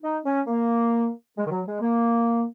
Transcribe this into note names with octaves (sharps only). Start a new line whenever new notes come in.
D#4
C#4
A#3
G#3
D#3
F#3
G#3
A#3